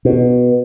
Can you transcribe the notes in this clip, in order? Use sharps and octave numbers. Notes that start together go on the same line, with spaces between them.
B2